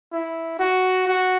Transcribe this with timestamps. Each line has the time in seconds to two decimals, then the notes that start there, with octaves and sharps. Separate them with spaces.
0.12 E4
0.59 F#4
1.08 F#4